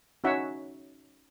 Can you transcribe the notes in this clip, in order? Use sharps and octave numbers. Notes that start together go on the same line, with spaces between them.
C#4 D#4 F#4 C#5 E5 F#5